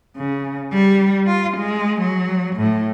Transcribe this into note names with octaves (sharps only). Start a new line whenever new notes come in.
C#3
G3
F4
G#3
F#3
A2